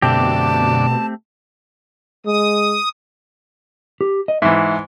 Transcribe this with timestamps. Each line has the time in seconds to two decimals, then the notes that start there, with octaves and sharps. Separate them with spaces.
0.02 F#2 B2 D3 A3 C4 G4 D5 A5
2.26 G#3 D#6
4.01 G4
4.28 D#5
4.42 G#2 E3 E5